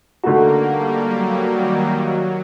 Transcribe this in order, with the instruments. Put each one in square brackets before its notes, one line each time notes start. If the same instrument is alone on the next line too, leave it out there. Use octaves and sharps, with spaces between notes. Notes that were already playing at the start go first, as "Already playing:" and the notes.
[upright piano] D3 A3 D#4 F#4 [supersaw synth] A#3
[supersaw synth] G3
F#3
D#3
F#3